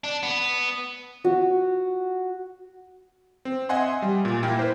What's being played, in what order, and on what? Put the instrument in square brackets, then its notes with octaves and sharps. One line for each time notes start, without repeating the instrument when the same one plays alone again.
[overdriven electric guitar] D4
B3
[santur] F#4
[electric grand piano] C4
D#5 E5 F#5 G#5 C6
G3
A#2
A#3 E4 A#4 G5
B4 C5